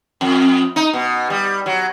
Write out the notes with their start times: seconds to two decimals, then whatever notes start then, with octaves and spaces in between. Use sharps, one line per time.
0.21 F2
0.76 D#4
0.93 B2
1.30 G3
1.66 F#3